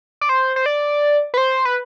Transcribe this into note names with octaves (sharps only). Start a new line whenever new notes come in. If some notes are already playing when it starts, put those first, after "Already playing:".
D5
C5
C5
D5
B4
C5
B4